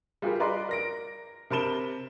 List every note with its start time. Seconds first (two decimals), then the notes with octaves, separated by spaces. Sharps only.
0.22 G3 F4 G4 G#4 A#4 B4
0.40 B4 D5 D#5 A#5 C6 D6
0.69 A#4 A#6 D7
1.50 C3 A#4 A5 B5 E7 G7